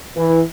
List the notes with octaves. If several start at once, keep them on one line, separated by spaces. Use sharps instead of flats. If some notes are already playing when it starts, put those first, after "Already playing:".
E3